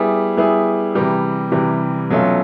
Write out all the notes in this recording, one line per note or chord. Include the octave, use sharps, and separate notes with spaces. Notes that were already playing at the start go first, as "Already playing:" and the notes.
Already playing: G3 B3 E4 G#4
G3 B3 E4 G#4
C3 E3 G3
C3 E3 G3
B2 F#3 A3 C#4 F4